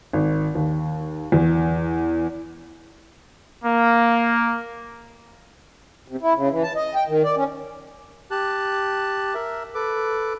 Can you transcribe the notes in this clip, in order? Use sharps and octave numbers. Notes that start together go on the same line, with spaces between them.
G#1
D#2
E2
A#3
C3
E4
C#3
E3
A5
D#5
G5
D#3
D5
C#4
G4 A5 F#6
A#4 E5
A4 B4 D6